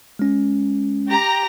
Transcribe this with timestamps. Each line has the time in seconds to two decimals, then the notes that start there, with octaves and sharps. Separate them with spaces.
0.19 G#3 C#4
1.09 G4 A#5